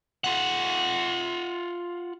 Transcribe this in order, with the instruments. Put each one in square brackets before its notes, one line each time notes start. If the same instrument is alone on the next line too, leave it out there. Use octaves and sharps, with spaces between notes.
[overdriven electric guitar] F4 F#5